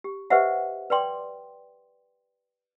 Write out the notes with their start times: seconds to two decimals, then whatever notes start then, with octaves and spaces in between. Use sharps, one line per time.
0.04 G4
0.30 G4 B4 C5 D#5 E5 F#5
0.90 B4 D5 G5 C6 D6